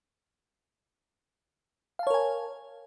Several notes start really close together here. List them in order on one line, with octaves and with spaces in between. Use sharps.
F5 A5 C#5 A#4 G#5